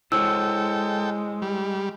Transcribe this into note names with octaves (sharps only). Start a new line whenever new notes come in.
G#3 E4 A4 C5 C#5 G5 E6
G3